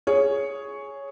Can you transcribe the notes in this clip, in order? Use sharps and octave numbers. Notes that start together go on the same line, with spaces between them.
G#4 C#5